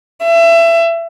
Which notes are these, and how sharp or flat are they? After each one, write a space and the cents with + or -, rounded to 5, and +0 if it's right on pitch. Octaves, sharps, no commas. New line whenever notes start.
E5 +25